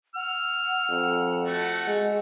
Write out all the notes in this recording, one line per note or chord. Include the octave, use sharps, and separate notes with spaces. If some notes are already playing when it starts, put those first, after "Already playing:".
F#5 E6 F6
F2
A3 F#4
G#3